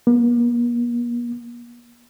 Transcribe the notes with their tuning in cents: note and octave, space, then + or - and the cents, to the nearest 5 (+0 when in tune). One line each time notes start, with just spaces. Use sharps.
A#3 +45